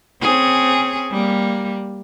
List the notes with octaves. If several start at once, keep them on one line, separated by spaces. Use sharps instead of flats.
C4 C#4 G#4
G3 A#3